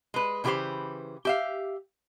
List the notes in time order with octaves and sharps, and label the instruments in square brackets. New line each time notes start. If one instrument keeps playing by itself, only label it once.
[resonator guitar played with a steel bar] G#3 B4
C#3 E3 E4 G4 B4 C5
G4 E5 F5